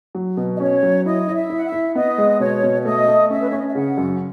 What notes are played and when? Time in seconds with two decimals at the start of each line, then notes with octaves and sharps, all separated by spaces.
0.15 F#3
0.37 B2
0.56 D#5
0.60 C#4 C#5
0.83 F#3
1.06 E4 D#5
1.28 E4
1.35 E5
1.50 E4
1.56 F#5
1.65 E5
1.72 E4
1.95 B3 D#5
2.18 G#3
2.40 B2 C#5
2.63 B2
2.81 E5
2.85 A3 D#5
3.07 A3
3.30 C#4 E5
3.40 B4
3.48 C#4 C#5
3.58 D#5
3.67 E5
3.75 C#3 F#5
3.98 F#2